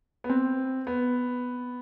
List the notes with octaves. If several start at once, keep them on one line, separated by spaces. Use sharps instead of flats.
B3
C4
B3